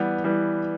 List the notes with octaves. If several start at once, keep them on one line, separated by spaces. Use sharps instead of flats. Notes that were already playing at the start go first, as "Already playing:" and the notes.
Already playing: E3 G3 B3
E3 G3 B3